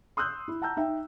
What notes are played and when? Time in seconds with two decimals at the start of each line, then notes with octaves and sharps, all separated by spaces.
0.17 C6 D#6 E6 F#6 G6
0.48 E4
0.62 F#5 A5 A#5 E6 G6
0.77 D#4 E5 G5